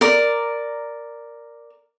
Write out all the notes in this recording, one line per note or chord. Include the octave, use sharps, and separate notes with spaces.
A#4 D5